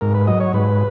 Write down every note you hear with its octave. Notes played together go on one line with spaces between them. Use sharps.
G#2 A#4
B4
F#3 D#5
C#5
G#2 B4